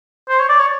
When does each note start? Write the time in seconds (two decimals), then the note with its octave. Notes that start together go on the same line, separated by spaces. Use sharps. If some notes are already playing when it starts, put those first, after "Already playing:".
0.29 C5
0.40 C#5
0.49 D5
0.59 C#5